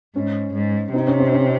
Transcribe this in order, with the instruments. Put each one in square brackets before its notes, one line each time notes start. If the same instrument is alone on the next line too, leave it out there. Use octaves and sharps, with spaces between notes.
[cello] G#2 [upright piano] C#4
[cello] G#2
[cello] C3 [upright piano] C4 D#4
[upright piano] C#4
C4
C#4